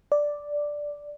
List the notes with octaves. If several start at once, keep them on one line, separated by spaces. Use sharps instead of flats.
D5